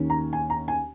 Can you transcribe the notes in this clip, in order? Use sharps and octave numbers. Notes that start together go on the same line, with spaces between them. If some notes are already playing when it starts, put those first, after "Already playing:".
Already playing: D#2 D#3 A#3 C#4
A#5
G#5
A#5
G#5